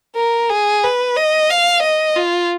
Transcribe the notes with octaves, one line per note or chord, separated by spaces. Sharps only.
A#4
G#4
B4
D#5
F5
D#5
F4